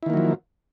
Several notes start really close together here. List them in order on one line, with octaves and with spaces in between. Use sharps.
E4 D#3 A#3 F#3 F3